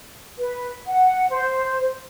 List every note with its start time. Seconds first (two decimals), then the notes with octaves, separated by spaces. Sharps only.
0.38 B4
0.87 F#5
1.30 C5